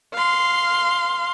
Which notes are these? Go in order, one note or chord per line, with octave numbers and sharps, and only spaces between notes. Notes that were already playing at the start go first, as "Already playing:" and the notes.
F5 C6